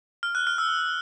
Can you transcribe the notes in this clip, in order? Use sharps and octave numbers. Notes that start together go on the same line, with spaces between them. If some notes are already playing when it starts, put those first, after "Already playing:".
F6
F#6
F6
E6